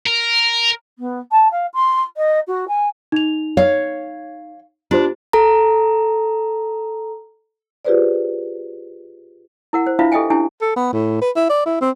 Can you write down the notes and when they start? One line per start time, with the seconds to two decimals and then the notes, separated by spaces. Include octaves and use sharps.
0.06 A#4
0.98 B3
1.31 A5
1.51 F5
1.74 C6
2.17 D#5
2.47 F#4
2.68 G#5
3.12 D#4 F7
3.57 C#5 F5
4.91 D4 F4 G4 C5
5.33 A4 A#5
7.85 F4 G4 G#4 B4 C5 D5
9.73 E4 A#4 F#5
9.87 C5
9.99 D4 E4 F4 B4 E5 F5
10.12 G4 A4 D#5 E5 G5 G#5
10.30 C#4 D4 E4 G4 G#5
10.61 A4
10.76 B3
10.93 A2
11.21 B4
11.36 E4
11.49 D5
11.66 E4
11.81 C4